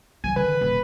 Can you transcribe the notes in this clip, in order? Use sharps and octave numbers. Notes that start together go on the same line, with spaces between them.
E3 F#3 G#5
D3 D#3 B4
D#1